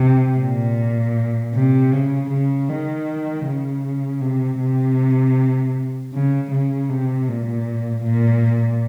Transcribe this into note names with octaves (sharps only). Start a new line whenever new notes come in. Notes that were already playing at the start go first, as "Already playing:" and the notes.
Already playing: C3
A#2
C3
C#3
C#3
D#3
C#3
C3
C3
C#3
C#3
C3
A#2
A#2